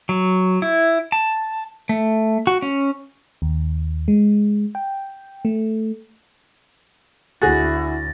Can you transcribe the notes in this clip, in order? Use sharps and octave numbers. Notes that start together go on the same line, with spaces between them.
F#3
E4
A5
A3
F#4
C#4
D#2
G#3
G5
A3
D2 E4 F#4 G#4 A6 A#6